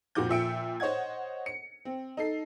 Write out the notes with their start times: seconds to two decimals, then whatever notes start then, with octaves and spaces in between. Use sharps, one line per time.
0.15 F2 A#2 F4 F#4 D6 G6
0.29 A#2 F3 E5 G5 C#7 D7
0.80 C5 C#5 D#5 F#5 G#6
1.46 C#7
1.85 C4
2.17 D#4 A4 C7